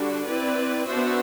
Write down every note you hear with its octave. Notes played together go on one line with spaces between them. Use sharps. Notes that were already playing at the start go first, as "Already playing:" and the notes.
Already playing: D3 G3 D4 F#4
C4 E4 B4 D5
B3 D4 F#4 C5 E5